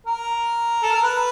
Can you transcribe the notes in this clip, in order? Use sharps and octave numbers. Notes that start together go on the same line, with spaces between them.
A#4
A4
A#4
B4